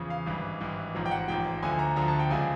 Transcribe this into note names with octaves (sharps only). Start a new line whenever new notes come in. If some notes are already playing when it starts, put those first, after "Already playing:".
Already playing: E2 C#3 F3
F5
G#1 G2 E3
G#1 G2 E3
A1 G#2 F3
G5
F#5
A1 G#2 F3 G5
D2 D3 F3 G#5
A#5
D2 D3 F3 A#5
A5
G5
C#2 C#3 F3 G#5